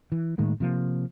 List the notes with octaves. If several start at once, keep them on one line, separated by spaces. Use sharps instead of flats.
E3
A2 D#3 G#3 A#3
C3 F3 A#3